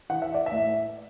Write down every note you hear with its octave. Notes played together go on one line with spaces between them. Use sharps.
E3 F#5
E5
D5
E5
A2